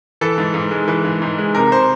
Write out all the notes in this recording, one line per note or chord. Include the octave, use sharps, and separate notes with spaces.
E3 A4
G#2
G#2
G#3
E3
G#2
G#2
G#3
C3 A#4
C5